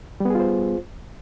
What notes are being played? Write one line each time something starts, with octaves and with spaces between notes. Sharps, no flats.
G3 B3 F4 G#4 C5